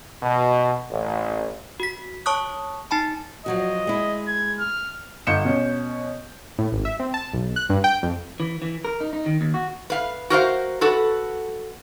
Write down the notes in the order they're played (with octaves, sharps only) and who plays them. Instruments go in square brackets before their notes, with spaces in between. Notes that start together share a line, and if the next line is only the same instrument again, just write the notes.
[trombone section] B2
A1
[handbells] F#4 B6
C#5 A5 C#6 D#6 F#6
D#4 G#5 A5 B5
[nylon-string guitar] F3 F#3 F#4 [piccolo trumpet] D#5
[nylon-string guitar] G#3 E4
[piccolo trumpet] G#6
F6
[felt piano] G1 D#5 G6 C#7 E7
B2 C#4
[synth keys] A2
G#1
E5
C4
A5
B1
F#6
G2
G5
F2
[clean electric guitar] E3
E3
A#4
D#4
D#4
D#3
D#2
F#4
[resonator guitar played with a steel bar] B4 F5
F#4 A#4 C5 F5
F#4 A4 B4